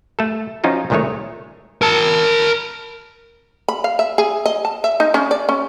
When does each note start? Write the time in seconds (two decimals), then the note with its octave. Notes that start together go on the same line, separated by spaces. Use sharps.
0.19 A3 A4
0.64 F3 C#4 D#4 F4 F#4
0.90 C2 A#2 D#3 G#3 A3 C#5
1.82 A#4 A5
3.68 B5
3.84 F5
3.99 E5
4.18 G#4
4.46 D#5
4.65 A5
4.84 E5
5.00 D#4
5.14 C#4
5.31 D5
5.49 C#4